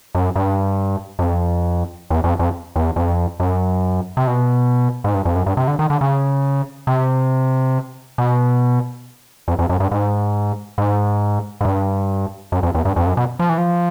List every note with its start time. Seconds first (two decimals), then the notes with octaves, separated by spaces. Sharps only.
0.15 F#2
0.36 G2
1.19 F#2
1.23 F2
2.10 E2
2.24 F2
2.39 F2
2.76 E2
2.96 F2
3.40 F#2
4.17 C3
4.27 B2
5.04 G#2
5.14 G2
5.25 F2
5.36 F#2
5.46 G2
5.57 C3
5.68 D3
5.79 D#3
5.90 D3
6.01 C#3
6.87 C3
8.18 B2
9.48 F2
9.59 F2
9.69 F#2
9.80 G2
9.91 G#2
10.78 G#2
11.61 G#2
11.65 G2
12.52 F#2
12.63 F2
12.75 E2
12.85 G2
12.96 F2
13.06 F#2
13.17 B2
13.39 F3
13.49 E3
13.58 F3